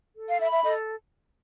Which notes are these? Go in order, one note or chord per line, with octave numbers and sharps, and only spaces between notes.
A4
F5
E5 B5
E5
A4 D#5